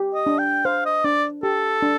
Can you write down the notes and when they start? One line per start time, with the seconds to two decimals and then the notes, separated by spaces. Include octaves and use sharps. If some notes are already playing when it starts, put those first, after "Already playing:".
Already playing: G4
0.14 D#5
0.26 D4
0.39 G5
0.65 C5 F5
0.85 D#5
1.04 D4 D5
1.43 G4 A4
1.82 D4